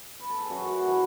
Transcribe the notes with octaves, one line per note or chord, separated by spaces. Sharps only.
B4
A4
G#4
F#2 F#4
F#4
E3 A3